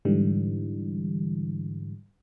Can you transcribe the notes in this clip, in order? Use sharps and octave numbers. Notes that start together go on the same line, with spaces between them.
G#2 D3 E3 G3